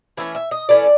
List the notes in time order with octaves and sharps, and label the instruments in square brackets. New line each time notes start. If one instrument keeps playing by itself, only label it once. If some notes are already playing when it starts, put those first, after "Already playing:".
[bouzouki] E3 A3 C#4 E5
E5
D#5
E3 A3 C#4 D5